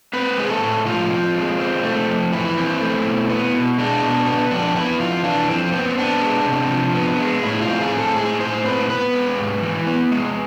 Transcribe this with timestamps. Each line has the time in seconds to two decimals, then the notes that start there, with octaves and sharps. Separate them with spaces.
0.13 C4 B4
0.38 G#3 G#4
0.50 A4
0.62 A2
0.86 F3 F4
1.11 C4
1.35 G#3
1.60 C4
1.84 A3
2.08 F2
2.32 E3 E4
2.57 C4
2.81 A3
3.06 B2
3.30 B3
3.54 B2
3.78 G#3 D4
4.02 B2
4.27 B3
4.51 F2 D4
4.76 B3 E4
5.00 F2 F4
5.24 E3 D4
5.49 F2 C4
5.73 B3 C4
5.97 B3 D4
6.21 G#3
6.46 C3
6.70 F3
6.95 B3
7.20 G#3
7.43 A2 E4
7.62 F4
7.67 C4
7.80 G#4
7.93 A2
7.98 A4
8.16 G#3 G#4
8.40 A2 C5
8.65 C4 B4
8.89 B3 B4
9.14 G#3
9.39 G#2
9.62 E3
9.87 B3
10.11 G#3